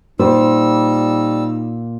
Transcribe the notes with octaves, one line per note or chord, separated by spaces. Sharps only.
A#2 G3 D#4 C5 E6